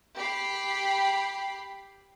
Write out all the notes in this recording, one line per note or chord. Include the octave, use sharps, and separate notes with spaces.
G4 B5 C7